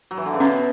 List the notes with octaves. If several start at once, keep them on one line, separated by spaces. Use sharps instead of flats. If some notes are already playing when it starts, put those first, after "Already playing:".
F#3
E3
D3
C#3
B2 C#4